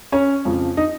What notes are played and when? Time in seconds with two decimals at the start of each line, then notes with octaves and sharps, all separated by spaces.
0.12 C#4 C#5
0.45 F2 C#3 F3
0.77 D#4 D#5